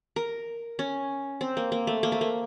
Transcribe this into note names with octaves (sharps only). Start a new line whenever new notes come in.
A#4
C#4
C4
A#3
A#3
A3
A#3
A3
A#3